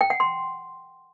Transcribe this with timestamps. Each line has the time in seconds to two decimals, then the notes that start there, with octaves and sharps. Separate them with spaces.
0.01 G5
0.10 F#5
0.20 C6